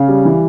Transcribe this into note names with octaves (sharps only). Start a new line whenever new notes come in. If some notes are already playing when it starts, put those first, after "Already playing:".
Already playing: C#3 F5
G3
E3